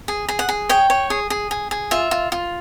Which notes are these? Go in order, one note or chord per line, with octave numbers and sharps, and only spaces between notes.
G#4
G#4
F#5
G#4
C#5 G5
C#5
G#4
G#4
G#4
G#4
F4 E5
F4
F4